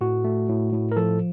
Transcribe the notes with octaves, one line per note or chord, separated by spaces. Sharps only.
A2 F#4
A3
A2
A2
A#4
F3 A4